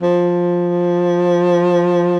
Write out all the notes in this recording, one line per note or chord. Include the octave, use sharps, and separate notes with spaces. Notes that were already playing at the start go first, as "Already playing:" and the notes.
F3